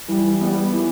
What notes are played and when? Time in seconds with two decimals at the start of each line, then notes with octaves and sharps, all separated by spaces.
0.08 E3 G3
0.41 G3 B3
0.73 E3